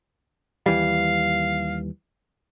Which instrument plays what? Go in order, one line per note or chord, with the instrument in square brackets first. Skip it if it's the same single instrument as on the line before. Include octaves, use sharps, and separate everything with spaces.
[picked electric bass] D#2 E3 G3 [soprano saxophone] F5